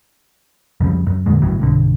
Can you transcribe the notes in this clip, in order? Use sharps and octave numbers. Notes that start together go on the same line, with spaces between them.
F2 C#3 G3
F#2
F2 A#2 D3 G#3
G1 C#2 A2 F#3
B1 G2 D3